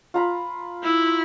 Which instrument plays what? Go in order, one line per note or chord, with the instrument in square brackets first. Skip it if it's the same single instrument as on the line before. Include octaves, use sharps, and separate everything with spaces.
[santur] F4 A#5 B5
[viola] E4